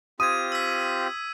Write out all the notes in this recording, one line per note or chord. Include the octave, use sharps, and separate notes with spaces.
C4 F4 G4 D#6 G#6 D#7
E6 B6